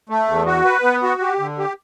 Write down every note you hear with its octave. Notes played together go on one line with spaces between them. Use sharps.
A3
E2
F#4
B4
B3
F#4
G4
D3
G4